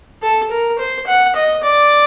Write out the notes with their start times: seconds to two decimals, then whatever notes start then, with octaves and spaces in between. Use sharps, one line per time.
0.22 A4
0.50 A#4
0.78 C5
1.07 F#5
1.36 D#5
1.63 D5